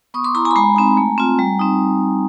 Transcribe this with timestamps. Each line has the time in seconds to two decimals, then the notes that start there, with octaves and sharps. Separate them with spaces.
0.14 B3 C#6 D#6
0.24 C6 D6
0.35 E4 A#5 C6
0.45 G#5 A#5
0.51 B5
0.56 G#3 G#5 A#5
0.76 C4 D#4
0.97 A3
1.18 C4 F4
1.39 G3
1.59 C4 D#4